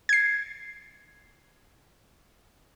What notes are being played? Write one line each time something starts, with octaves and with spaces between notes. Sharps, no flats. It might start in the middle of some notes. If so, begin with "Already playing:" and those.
G#6 C7